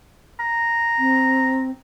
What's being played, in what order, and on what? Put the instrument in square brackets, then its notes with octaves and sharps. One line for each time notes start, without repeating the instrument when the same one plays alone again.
[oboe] A#5
[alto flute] C4